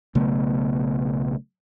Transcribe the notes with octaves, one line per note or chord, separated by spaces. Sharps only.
B1 C#3 A3 B3